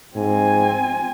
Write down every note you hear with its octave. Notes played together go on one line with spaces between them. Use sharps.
G#2 C4 G#5